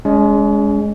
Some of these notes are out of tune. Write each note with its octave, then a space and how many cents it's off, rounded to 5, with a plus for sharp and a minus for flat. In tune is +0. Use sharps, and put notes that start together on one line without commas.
G#3 +0 C#4 +40